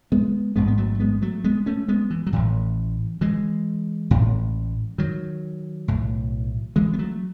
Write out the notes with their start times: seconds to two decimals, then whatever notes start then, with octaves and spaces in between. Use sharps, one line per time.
0.12 G#3 B3
0.56 A1 G#2 G#3 B3
0.68 B3
0.77 F#3 A3
1.00 G#3 B3
1.22 F#3 A3
1.44 G#3 B3
1.66 A3 C#4
1.88 G#3 B3
2.10 E3
2.27 F#3
2.33 A1 A2 E3
3.21 E3 G#3
4.11 A1 A2
4.98 D#3 F#3
5.88 B1 A2
6.76 E3 G#3
6.93 B3
6.99 F#3 A3